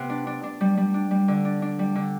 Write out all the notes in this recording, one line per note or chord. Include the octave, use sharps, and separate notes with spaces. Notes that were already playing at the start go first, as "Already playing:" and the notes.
Already playing: C3 B3
D4
D4
D4
G3
G3
D4
G3
D3
D4
D4
G3
D3